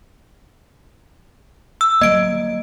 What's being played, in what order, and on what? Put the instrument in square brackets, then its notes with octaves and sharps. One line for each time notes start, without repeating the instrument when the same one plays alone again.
[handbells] E6
[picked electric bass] F#3 G3 A#3 [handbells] D#5 D7